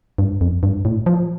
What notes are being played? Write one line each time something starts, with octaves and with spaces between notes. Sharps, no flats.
G2
F2
G2
A2
F3